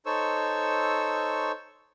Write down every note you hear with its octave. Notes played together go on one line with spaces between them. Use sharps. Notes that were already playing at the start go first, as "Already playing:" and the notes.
D#4 A4 C5 C#5 C#6 E6